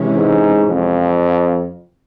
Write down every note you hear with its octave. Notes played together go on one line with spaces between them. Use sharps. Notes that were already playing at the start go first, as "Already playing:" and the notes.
Already playing: C3 E3 G#3 C#4
G#2
F2